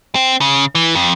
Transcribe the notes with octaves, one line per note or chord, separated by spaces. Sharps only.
C4
C#3
E3
F2